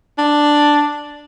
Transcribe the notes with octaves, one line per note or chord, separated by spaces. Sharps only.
D4